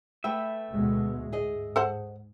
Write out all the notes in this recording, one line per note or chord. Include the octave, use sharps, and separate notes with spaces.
A3 B4 E5 G5
D2 B2 G#3
G#2 G#4 D#5
A4 C5 F#5